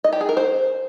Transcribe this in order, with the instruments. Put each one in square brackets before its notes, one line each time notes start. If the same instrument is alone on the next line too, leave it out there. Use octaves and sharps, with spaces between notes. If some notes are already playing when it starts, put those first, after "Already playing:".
[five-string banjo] D#5
G4
G#4
A#4
C5